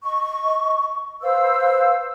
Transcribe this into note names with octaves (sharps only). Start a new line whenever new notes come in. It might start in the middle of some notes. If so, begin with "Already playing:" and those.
D#5 C#6
B4 C5 F5 E6